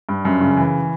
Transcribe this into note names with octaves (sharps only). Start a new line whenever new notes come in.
G2
F#2
C#3
E3